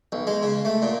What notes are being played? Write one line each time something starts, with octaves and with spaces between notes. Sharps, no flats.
B1
G#3
C#3
A3
A#2